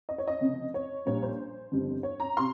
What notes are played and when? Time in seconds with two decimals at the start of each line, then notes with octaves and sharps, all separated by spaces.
0.09 D#5
0.18 C#5
0.27 D#5
0.41 F1 F2 C#3
0.74 C#5
1.06 A#1 A#2 G3 C#4 C#5
1.23 C5
1.72 G1 F2 C#3 G3
2.03 C#5
2.20 A#5
2.37 C3 C6